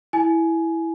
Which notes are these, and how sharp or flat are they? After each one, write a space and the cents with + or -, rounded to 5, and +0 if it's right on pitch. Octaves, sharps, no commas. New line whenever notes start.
E4 +0 G#5 +20